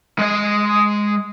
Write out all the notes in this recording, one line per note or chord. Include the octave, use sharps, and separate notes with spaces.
G#3 D#5